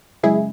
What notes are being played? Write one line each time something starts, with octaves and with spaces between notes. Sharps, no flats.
F#2 C#3 G#3 E4 G#4